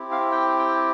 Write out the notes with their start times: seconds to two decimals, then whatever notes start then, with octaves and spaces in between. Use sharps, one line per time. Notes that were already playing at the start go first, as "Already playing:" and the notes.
Already playing: C4 E4 G4
0.11 F5
0.32 G5
0.59 G5